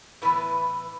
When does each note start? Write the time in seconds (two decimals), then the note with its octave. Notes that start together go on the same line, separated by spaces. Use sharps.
0.22 A2 E3 B3 B4